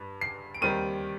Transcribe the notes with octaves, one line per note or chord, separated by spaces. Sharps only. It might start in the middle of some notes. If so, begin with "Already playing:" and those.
Already playing: G2
C7
D7
D#2 D#3 G3 C4 D#7